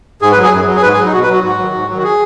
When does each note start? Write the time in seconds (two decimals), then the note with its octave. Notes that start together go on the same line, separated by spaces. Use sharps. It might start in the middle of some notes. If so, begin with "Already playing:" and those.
0.22 G#2 G#4
0.32 B4
0.36 F#3
0.43 G#4
0.52 F#2
0.67 F#3
0.75 G#4
0.82 G#2 B4
0.93 G#4
0.98 F#3
1.05 D#4
1.13 B2 F#4
1.22 B4
1.28 F#3 F#4
1.43 G#2 F#4
1.59 D#3 F#3
1.74 G#2
1.88 F#3
1.93 D#3 F#4
2.03 G#4